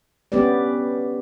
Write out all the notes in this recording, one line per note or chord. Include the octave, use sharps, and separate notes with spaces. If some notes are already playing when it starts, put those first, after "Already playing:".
B3 C#4 G4 B4 D5